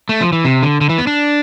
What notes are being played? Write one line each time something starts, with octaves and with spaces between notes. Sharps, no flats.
A3
F3
E3
C3
D3
D3
E3
B3
D4